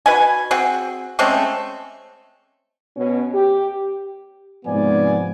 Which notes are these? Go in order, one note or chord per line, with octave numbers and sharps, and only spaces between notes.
F#4 B4 D#5 G#5
C4 F#4 G#4
G#3 A3 C4 C#4
B2 C#4
G4
G#2 C3 F3 B3 D5 G#5